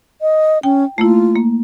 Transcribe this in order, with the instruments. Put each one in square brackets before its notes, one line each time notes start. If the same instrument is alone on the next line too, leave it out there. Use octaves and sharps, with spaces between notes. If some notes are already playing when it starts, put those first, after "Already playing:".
[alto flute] D#5
[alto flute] C#4 [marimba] G5
[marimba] A3 A#3 E4 [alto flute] F4
[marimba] A#3